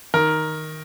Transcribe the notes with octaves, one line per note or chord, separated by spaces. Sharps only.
D#3 A#4